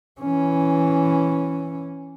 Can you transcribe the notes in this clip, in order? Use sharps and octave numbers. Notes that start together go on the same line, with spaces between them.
E3 C#4